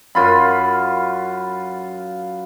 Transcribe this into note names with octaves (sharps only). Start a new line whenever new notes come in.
F#2 F4 B5